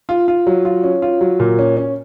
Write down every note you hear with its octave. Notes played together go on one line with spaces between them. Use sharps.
F4
F4
F#3
F4
C#4
F4
F#3
A#2
C#4
C#4